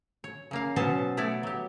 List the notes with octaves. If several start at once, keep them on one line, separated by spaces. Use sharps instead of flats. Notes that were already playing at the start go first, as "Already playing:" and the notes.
C#5
C#3 A#3 F5
B2 F#3 B3 C#4 C5 A5
A3 B3 E4 C#5 D5
F#3 G4